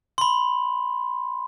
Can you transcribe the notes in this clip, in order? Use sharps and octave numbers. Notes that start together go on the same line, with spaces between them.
B5 C6